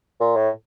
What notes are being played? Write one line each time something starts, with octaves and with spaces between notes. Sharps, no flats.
A#2
A2